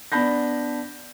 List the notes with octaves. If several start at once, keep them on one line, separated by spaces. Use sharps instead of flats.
B3 D4 A5 B5 G6 A#6